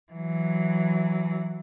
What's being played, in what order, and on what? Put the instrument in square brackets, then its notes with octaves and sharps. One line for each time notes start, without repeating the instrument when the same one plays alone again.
[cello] E3 F#3